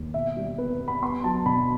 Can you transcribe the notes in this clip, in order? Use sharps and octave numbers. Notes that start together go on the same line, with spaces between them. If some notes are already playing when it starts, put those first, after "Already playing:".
Already playing: D#2
B2 E5
G3
B3 B4
B3
B5
B3 C6
F#3 A5
B2 B5